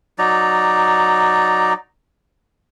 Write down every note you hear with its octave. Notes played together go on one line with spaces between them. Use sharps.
F#3 D#4 D5 A#5